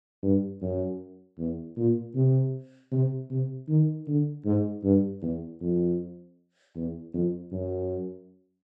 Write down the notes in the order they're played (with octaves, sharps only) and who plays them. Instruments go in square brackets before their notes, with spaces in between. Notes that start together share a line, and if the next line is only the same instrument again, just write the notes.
[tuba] G2
F#2
E2
A#2
C3
C3
C3
D#3
D3
G#2
G2
E2
F2
E2
F2
F#2